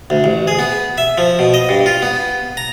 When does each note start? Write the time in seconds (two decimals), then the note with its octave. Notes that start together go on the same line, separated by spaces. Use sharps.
0.10 D2
0.24 A1
0.47 G#4
0.59 B3
0.98 E5
1.18 F3
1.39 B2
1.54 D#5
1.69 G2
1.86 F4
2.02 B3
2.57 A#5